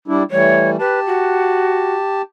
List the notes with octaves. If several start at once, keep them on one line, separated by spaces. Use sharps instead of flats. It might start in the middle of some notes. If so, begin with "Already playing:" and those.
G3 D4 E4
E3 G3 A3 C#5
G4 B4 A5
F#4